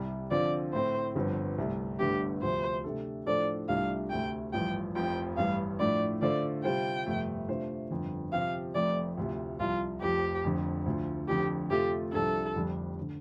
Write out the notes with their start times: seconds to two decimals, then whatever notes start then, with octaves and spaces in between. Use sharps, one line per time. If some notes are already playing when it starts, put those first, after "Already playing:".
Already playing: C2 C3 G3
0.31 D3 F3 C4 F4 D5
0.73 A2 A3 C4 C5
1.15 G1 G2 D3 F3 C4
1.58 C2 C3 A3
1.99 G1 G2 D3 A3 D4 G4
2.42 D2 C3 F3 C5
2.84 C3 A3 D4 A4
3.26 A2 F3 D4 A4 C5 D5
3.69 C2 C3 A3 D4 F4 F5
4.10 D2 C3 A3 G5
4.53 A1 G2 F3 G5
4.95 F1 F2 F3 C4 G5
5.37 A1 G2 G3 F5
5.79 A2 F3 A3 D4 D5
6.22 D3 A3 F4 A4 C5 D5
6.64 C3 G3 F4 C5 G5
7.06 G1 F2 C3 A3
7.48 C3 A3 D4 F4 C5
7.91 G1 F2 D3
8.33 C3 F3 C4 G4 F5
8.75 F1 F2 F3 A3 D5
9.17 D2 C3 F3
9.60 C2 C3 F3 F4
10.01 F1 F2 F3 G4
10.44 F1 F2 D3
10.86 D2 D3 F3
11.28 F1 F2 D3 G4
11.70 F2 C3 A3 F4 G4 A4
12.13 C2 C3 F3 D4 A4
12.55 F1 F2 D3 G3 D4
13.01 D3